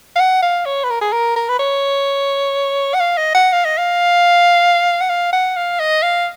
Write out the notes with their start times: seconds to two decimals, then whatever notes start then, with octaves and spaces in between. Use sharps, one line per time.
0.16 F5
0.20 F#5
0.43 F5
0.66 C#5
0.84 B4
0.90 A#4
1.01 G#4
1.12 A#4
1.36 A#4
1.49 B4
1.59 C#5
2.94 F#5
3.00 F5
3.18 D#5
3.35 F#5
3.53 F5
3.65 D#5
3.78 F5
5.01 F#5
5.09 F5
5.33 F#5
5.56 F5
5.80 D#5
6.03 F5